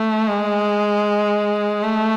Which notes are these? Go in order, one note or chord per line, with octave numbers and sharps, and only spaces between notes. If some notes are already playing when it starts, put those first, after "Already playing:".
Already playing: A3
G#3
A3